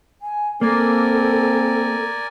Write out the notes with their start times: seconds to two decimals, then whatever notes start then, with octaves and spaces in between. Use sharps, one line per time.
0.22 G#5
0.61 A#3 C4 A4 A#4 D5 G#5